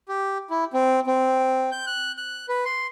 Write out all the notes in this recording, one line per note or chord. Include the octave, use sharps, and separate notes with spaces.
G4
E4
C4
C4
G6
F#6
F#6
B4
C6